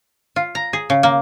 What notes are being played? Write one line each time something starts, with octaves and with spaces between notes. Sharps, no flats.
F4
A#5
G#4
C#3
A#3